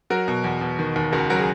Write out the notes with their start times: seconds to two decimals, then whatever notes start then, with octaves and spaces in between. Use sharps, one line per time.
0.10 F#3 F#4 A#4
0.28 B2
0.44 E2
0.61 B2
0.79 D#3
0.96 D#2
1.12 C#2 F#4 A#4
1.30 F#3 F#4 A#4
1.38 G#4